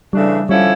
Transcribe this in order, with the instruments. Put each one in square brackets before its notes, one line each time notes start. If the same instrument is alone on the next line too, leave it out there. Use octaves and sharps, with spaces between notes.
[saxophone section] C#3 E3 A3 D4 [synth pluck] G3
[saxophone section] D3 F3 C#4 E4 [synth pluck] G3